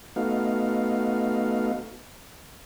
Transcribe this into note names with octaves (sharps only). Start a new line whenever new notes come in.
A3 B3 D#4 F#4 F5